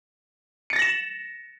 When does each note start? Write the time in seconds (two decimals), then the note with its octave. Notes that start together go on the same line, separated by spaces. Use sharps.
0.70 C#7
0.73 A6
0.76 A#6
0.79 F#7
0.82 E7